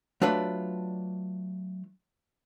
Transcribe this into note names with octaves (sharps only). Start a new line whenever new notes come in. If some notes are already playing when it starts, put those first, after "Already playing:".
F#3 A3 D4 F4 B4 D5